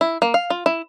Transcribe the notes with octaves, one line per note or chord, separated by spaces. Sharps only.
E4
A#3
F5
F4
E4